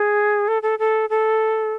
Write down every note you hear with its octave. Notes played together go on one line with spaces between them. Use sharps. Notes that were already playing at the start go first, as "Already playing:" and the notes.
Already playing: G#4
A4
A4
A4
A4